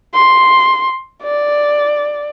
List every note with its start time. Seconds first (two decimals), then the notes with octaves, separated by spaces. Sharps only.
0.14 C6
1.23 D5